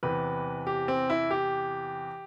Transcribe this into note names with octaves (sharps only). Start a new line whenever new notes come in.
E2 C3 E3 B4
G4
C4
E4
G4